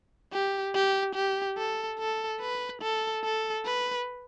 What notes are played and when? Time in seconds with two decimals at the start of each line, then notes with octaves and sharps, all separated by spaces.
0.33 G4
0.74 G4
1.15 G4
1.58 A4
1.99 A4
2.41 B4
2.82 A4
3.24 A4
3.66 B4